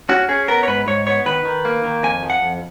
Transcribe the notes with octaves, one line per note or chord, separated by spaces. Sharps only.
C#4 F#4
C#4 G#4
B3 A#4
C#5
G#2 B4
G#2 C#5
B3 C#5
D#3 B4
D#3
A#3
D#3
F2 G#5
F3
F#5
F2